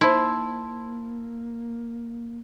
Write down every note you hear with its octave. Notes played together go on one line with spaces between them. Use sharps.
A#3 D#4 E4 C5 A5 C6 E6